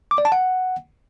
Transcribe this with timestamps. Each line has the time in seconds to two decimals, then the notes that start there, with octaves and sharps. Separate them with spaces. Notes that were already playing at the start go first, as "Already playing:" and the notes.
0.11 D6
0.18 D5
0.25 A5
0.32 F#5